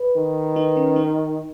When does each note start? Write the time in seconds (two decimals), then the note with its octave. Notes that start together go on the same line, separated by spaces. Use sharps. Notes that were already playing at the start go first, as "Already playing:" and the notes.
Already playing: B4
0.17 D#3
0.56 D#4
0.77 C#4
0.96 D#4